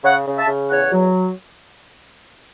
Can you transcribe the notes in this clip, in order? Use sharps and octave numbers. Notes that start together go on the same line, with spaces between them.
C#3 C#5 F#5
C#3
E5 A5
C#3
E2 C#5 F#5
F#3